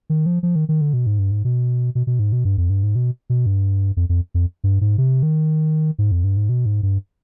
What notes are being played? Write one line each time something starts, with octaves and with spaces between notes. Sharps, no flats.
D#3
F3
F3
D#3
D#3
D3
B2
G#2
G2
G#2
B2
B2
B2
G#2
B2
G2
F2
G2
G#2
B2
B2
G2
F2
F2
F2
G2
G#2
C3
D#3
G#2
F2
G2
G#2
B2
G#2
G2